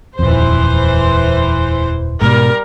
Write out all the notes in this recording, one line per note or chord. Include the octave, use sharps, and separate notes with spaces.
D#1 F2 E3 C5
G#2 B2 G3 A#4